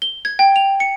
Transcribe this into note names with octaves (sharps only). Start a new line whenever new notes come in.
G7
G#6
G5
F7
C#7